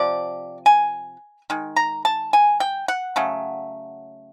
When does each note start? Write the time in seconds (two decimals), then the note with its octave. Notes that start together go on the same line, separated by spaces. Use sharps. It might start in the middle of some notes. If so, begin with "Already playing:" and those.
Already playing: C3 F3 D5
0.66 G#5
1.50 D#3 G#3
1.76 A#5
2.05 A5
2.33 G#5
2.60 G5
2.88 F#5
3.16 C#3 F#3 A3